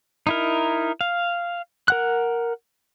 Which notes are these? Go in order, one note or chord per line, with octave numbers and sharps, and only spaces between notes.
D#4 E4 A#4
F5
A#4 F#5 F#6